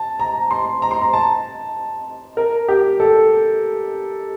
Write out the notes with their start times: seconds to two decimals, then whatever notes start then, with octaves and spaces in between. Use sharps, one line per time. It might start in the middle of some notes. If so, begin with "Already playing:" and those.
Already playing: A5
0.20 A#5
0.51 C6
0.82 A#5
0.91 C6
1.02 A#5
1.13 A5
2.37 A#4
2.68 G4
3.00 A4